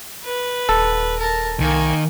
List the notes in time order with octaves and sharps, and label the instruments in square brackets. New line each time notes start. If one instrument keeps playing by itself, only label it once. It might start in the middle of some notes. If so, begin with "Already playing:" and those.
[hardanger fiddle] B4
[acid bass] D#1 [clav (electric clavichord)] A4
[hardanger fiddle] A#4 A5
[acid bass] C2 [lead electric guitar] D#3 [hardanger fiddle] A#3 G#5